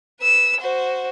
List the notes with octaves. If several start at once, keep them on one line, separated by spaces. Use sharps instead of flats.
B4 E6
F#4 C5